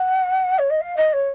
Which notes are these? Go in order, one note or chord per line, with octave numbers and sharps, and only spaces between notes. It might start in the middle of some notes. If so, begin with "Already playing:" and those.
Already playing: F#5
C#5
D#5
F5
D#5
C#5